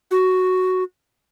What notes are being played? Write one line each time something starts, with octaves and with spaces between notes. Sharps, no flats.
F#4